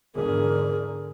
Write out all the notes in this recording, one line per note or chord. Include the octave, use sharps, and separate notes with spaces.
E2 G#2 D3 G#4 A#4